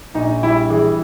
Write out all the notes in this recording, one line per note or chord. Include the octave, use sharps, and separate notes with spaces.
A#1 D#4
G3 E4
E3 G#4